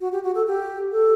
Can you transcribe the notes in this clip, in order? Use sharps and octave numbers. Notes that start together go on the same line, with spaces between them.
F#4
G4
F#4
A4
G4
A4